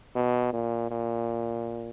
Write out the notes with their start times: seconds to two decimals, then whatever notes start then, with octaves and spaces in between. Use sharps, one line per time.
0.15 B2
0.53 A#2
0.91 A#2